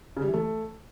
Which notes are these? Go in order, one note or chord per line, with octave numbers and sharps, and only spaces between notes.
C#3
G3
E3
A3